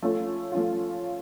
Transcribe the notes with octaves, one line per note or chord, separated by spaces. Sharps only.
F3 A3 C#4 F4
F3 A3 C#4 F4